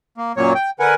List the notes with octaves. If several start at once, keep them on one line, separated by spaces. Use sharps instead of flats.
A#3
F#2 A#2 F#3 A#3 C#5
G5
D3 A#4 B4 F#5 G#5